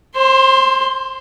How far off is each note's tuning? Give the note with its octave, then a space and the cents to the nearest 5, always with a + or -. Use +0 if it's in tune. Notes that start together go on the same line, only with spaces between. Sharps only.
C5 +30 C6 -5